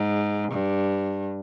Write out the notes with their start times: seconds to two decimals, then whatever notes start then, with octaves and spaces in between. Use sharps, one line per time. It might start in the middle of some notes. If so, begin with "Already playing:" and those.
Already playing: G#2
0.52 G2